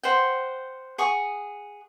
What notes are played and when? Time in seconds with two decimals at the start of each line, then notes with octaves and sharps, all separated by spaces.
0.03 C5 F#5 G5
0.98 G#4 F#5 C#6 D#6